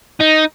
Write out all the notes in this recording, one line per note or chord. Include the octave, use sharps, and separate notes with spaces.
D#4